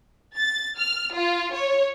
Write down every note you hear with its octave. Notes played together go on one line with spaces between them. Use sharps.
A6
F6
F4
C#5